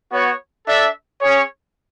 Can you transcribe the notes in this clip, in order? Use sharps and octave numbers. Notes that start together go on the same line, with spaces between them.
B3 F#4 C#5
D4 A4 E5
C#4 G#4 C#5